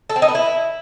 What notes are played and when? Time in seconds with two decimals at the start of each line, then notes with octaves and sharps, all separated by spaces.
0.10 A4
0.16 C4
0.22 D#4
0.28 B3
0.35 E4